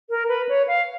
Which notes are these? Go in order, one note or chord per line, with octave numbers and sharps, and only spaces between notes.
A#4
B4
C#5
F5